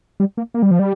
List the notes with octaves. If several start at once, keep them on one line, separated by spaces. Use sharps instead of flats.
G3
A#3
A#3
G3
F3
G3